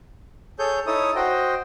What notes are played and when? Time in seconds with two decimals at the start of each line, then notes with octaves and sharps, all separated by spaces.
0.59 G#4 A4 C#5 G6
0.87 D#4 E4 A4 C#5 D#6
1.16 F#4 C5 D#5 G5